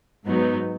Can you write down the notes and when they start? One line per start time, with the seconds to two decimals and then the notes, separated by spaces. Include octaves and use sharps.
0.26 G#2 F#3 B3 D#4